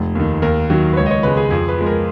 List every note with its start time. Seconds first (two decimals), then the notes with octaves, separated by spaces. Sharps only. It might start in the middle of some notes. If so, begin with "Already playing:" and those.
Already playing: F1
0.15 D#2 D#3
0.42 D#2 A#4
0.70 D#3 F#3
0.93 B4
0.97 C#2 C#5
1.06 D#5
1.11 C#5
1.23 C#3 G#3 B4
1.37 G#4
1.50 F2 G#4
1.69 B4
1.78 F3 G#3
1.86 A#4